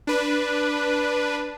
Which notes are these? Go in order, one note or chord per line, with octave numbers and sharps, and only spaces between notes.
D4 B4